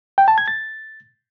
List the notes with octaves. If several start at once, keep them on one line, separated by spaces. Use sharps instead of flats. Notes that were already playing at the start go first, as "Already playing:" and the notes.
G5
A5
G#6
A6